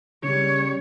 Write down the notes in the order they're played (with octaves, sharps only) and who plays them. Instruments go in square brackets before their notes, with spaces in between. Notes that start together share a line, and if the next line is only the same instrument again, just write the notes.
[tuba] C#3 [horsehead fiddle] G3 C#5